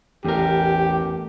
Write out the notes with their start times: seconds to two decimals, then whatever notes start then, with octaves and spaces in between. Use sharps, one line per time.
0.25 A1 E2 G4 A#4